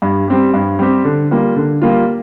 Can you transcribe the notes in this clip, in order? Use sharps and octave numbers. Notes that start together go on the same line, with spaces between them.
G2
G3 C4 G4
G2
G3 C4 G4
D3
G3 A#3 F4
D3
G3 A#3 F4